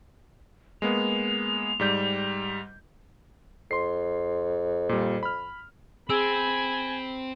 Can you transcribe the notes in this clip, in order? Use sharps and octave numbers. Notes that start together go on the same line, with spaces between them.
G#3 A#3 B3 F7
G#2 G3 G6
F2 C6 C7
A#2 G3
B5 F6
C4 G#4 G#5 B5 E6 D7